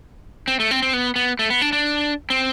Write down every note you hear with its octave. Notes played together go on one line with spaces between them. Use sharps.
C4
A3
C4
C4
B3
B3
A3
B3
D4
D4
C4